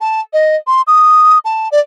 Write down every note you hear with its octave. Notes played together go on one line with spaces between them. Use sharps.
A5
D#5
C6
D#6
A5
D5